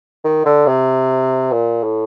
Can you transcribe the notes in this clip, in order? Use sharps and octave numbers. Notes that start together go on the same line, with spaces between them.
D#3
D3
C3
A#2
A2